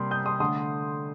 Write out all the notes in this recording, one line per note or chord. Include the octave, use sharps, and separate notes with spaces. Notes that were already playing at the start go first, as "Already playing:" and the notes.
Already playing: C3 G3 A#3 C6 D#6
D#6 G6
C6 D#6
D3 A3 C6 D#6